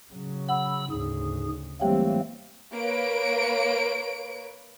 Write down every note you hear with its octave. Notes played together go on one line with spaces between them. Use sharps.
C#3 F#3
F#5 B5 E6
D2 G#2 C#3 G#4
E3 F#3 G3 A3 A#3 C4 G4 G5
A#3 B4 C#5 D7